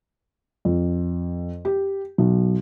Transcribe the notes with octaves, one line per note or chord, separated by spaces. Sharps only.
F2
G4
B1